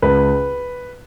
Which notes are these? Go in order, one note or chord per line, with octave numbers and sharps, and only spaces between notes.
C#2 B4